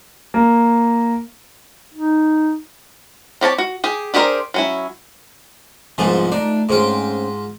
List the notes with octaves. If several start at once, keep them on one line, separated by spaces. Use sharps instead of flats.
A#3
D#4
C4 G4 C#5 A5
F#4
G4 G#4
D4 G4 G#4 A#4 C5
F#3 C#4 E4
C2 G#2 F3 B3 F4 G#4
A3 D4 D#4
G#2 C4 C#4 F4 G#4